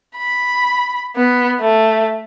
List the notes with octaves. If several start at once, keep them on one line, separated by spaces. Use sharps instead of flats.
B5
B3
A3